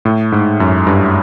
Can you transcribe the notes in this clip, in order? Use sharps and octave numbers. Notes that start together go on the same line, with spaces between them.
A2
G#2
F#2
G2